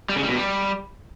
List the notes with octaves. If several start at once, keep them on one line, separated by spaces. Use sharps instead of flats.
G3
C#3
G3
B2
G3